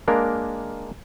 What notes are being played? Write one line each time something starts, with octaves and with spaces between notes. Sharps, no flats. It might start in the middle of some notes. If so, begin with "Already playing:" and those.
G#3 A#3 D4 A#4